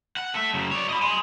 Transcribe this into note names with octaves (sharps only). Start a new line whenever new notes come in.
F#5
A4 E5
F#2 C#3
C#5 D5
D#5 B5
G#5 C6